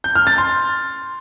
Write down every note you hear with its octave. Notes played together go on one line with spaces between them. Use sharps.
G6
F6
A6
C6